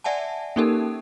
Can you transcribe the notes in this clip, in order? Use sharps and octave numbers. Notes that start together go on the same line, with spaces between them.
D5 E5 F#5 G#5 A5
A#3 C#4 D#4 G4 A4 A#4